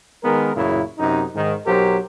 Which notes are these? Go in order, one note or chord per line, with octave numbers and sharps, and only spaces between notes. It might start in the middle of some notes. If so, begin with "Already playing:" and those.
D#3 G#3 B3 A#4
A1 F#2 A#2 C#3 E4
F#2 C3 D#4
G#2 D#3
B1 F#3 G4 A#4 C5